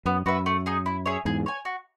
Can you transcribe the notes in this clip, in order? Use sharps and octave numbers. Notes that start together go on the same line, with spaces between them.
F#2 B3
F#2 F#4 B4 E5
A3
D#4 G#4
E4
G#4 C#5 E5
E2 G#2 G#4
C#5 G#5
F#4